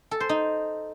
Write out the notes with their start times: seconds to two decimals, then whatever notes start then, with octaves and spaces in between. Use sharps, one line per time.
0.11 A4
0.20 C5
0.29 D#4